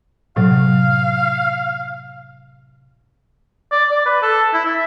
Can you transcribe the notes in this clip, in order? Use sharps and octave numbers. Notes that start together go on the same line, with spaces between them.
A2 C3 F#3 F5
D5
D5
B4
A4
E4
E5